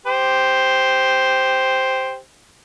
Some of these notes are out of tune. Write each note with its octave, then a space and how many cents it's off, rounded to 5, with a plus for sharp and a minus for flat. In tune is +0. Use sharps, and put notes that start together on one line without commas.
G4 +0 C5 +0